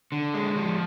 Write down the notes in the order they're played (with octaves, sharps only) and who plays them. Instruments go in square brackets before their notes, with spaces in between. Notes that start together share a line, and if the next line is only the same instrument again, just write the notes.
[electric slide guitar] D3
G#3
F3